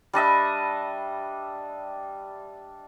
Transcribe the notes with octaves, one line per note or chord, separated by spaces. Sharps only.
G3 D4 D#5 E5